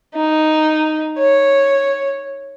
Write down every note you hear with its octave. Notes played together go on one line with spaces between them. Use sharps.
D#4
C#5